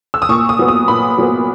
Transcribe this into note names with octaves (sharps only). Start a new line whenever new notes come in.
E6
D#6
A#2 C#6
D#6
F#3 B3
D#6
A#2 B5
F#3 B3